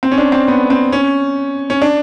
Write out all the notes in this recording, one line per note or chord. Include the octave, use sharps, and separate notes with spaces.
C4
C#4
D4
C4
B3
C4
C#4
C#4
D4